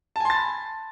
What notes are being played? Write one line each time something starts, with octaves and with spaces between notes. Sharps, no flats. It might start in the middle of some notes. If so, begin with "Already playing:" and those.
G#5 A5 B5 C6 A6